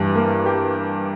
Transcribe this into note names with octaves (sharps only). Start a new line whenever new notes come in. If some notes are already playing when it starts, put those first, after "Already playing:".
Already playing: G2 E3
A#3
G4